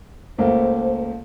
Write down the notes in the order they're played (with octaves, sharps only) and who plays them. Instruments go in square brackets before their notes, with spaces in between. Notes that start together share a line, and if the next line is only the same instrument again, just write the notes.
[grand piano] C#2 A3 A#3 [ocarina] C5